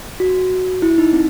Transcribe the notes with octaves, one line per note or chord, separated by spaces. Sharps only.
F#4
E4
D#4
C4